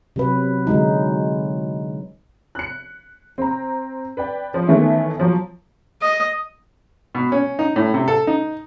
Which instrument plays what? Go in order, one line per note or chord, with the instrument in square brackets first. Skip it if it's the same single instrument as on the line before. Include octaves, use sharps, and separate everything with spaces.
[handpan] C3 F#3 B4
D3 F#3 G#3 D#4
[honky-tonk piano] F#6 C#7
C4 A#5
B4 D5 G5
F3
D#3 E3 A3 B3 C#4 E4
F3 F#3
[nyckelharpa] D#5
[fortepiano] B2
C#4
D#4
A2
C3
A4
D#4